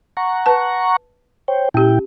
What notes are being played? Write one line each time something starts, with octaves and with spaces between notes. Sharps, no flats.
F#5 A#5 C#6
B4 A5
C5 C#5 G5
A#2 C#4 E4 G4 G5